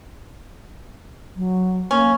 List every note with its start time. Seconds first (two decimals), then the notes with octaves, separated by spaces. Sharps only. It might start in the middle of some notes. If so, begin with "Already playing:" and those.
1.36 F#3
1.91 A#3 C#4